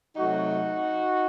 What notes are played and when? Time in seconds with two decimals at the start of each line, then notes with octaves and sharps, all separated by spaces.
0.16 C3 F#3 A3 D#4 F#4